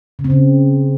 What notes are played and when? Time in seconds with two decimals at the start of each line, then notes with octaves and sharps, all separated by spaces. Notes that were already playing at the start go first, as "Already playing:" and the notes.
0.19 C#3
0.24 C4
0.30 C#3